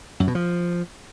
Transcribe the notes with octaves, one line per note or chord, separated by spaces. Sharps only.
F#2
B2
F3